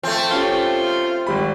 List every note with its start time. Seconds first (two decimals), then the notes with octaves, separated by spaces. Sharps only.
0.03 F3 A3 C4
0.31 C#4 F4 G4
1.27 G#1 G3 B5